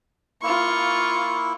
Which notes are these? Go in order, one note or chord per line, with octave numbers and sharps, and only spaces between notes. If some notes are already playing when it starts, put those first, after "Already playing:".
A#3 E4 F4 C#6